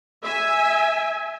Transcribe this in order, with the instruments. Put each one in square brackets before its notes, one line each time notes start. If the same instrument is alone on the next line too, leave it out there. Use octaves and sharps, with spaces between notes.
[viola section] E5 G#5